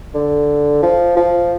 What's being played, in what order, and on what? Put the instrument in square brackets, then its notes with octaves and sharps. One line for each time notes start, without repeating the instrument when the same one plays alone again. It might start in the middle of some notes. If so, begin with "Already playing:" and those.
[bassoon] D3
F3
F3